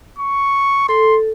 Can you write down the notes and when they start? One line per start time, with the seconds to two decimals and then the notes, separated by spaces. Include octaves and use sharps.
0.19 C#6
0.89 A4 C6